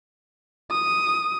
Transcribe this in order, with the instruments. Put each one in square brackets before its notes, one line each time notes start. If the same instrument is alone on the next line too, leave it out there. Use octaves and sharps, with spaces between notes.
[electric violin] D#6